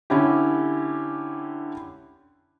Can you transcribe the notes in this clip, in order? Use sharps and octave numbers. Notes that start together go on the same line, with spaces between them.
D3 C#4 E4 G4